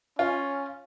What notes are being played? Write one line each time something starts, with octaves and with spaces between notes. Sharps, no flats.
C#4 F4